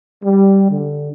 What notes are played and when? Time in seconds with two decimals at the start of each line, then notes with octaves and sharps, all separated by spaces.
0.23 G3
0.69 D3